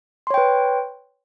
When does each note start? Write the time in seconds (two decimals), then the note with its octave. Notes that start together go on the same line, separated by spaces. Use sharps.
0.27 C6
0.30 C#5
0.34 G5
0.38 B4